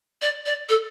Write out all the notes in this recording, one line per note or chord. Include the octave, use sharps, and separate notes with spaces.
D5
D5
A4